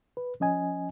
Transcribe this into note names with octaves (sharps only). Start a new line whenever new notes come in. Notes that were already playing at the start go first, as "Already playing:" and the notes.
B4
F3 C#4 D#5 G#5